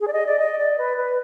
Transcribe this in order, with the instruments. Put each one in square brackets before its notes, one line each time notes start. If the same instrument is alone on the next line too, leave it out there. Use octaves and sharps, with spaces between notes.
[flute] G#4
D5
D#5
D5
D#5
D5
B4
B4